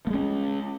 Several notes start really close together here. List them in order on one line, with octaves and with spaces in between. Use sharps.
A#3 G#3 C#4